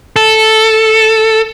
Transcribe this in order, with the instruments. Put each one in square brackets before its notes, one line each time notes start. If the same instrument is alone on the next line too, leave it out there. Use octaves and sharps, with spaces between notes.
[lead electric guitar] A4